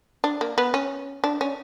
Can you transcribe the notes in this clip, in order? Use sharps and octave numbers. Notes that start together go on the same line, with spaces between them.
D4
A#3
B3
C#4
D4
C#4